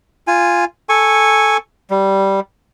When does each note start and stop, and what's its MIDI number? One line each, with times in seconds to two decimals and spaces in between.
0.27 0.65 65
0.27 0.65 80
0.89 1.57 69
0.89 1.57 80
0.89 1.57 85
1.90 2.40 55